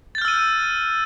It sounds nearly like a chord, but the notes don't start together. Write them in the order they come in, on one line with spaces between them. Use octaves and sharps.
A6 G6 F6 E6 D#7